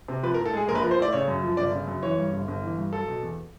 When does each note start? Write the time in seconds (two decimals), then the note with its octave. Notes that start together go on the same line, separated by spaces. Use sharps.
0.08 C3
0.23 F3 B4
0.34 A#4
0.39 A2
0.46 A4
0.53 G#3 G#4
0.68 A#1 A#4
0.75 B4
0.82 F3 A#4
0.91 C5
0.99 A2 D5
1.13 C#3 C#5
1.28 F#2
1.43 F3
1.57 G1 D5
1.72 C#3
1.87 F#2
2.02 E3 C#5
2.18 G2
2.33 G1
2.48 G1
2.62 E3
2.77 G2
2.92 F#3 A4
3.08 B2
3.23 E2